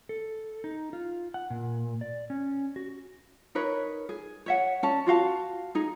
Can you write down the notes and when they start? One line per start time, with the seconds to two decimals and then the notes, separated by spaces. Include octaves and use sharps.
0.09 A4
0.64 D#4
0.93 F4
1.34 F#5
1.50 A#2
2.01 D5
2.30 C#4
2.76 F#4
3.55 D#4 A#4 B4 C#5
4.09 G#4
4.46 C#5 E5 F#5
4.83 C#4 D5 A5
5.06 F4 F#4 F5 A5
5.75 D#4 G#4